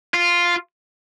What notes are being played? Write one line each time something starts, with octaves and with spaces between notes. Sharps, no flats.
F4